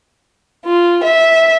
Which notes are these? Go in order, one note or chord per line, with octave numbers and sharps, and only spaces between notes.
F4
E5